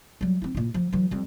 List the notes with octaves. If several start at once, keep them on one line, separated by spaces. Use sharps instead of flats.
F#3 G3
C4 E4
A#2 E4
F3
E3 F#3
F2 G3